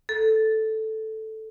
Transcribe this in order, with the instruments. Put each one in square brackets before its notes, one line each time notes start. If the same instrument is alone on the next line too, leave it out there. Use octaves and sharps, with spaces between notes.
[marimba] A4